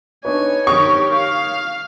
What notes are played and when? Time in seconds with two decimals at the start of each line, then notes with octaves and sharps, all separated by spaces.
0.25 D4 D#4 B4 C#5 G#5
0.67 D#3 G4 A#4 C#6 D#6
1.12 F5